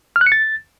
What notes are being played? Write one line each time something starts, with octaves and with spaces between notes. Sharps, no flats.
F6
F#6
C#7
A6